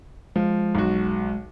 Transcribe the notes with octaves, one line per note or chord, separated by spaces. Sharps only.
F3 G#3
B1 F#4